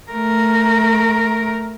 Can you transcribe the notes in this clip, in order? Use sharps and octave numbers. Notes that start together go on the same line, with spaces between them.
A3 A#4